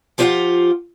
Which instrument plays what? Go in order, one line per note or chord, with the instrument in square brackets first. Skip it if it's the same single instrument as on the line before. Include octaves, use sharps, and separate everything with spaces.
[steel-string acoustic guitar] F3 F4 G4 C5 F5 F#5